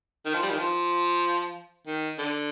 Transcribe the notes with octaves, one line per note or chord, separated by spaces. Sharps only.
D#3
F3
G3
D#3
F3
D#3
D3